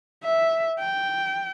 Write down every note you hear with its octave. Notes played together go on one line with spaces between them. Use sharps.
E5
G5